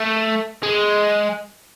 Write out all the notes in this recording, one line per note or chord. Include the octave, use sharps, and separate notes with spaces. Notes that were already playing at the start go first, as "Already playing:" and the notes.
Already playing: A3
G#3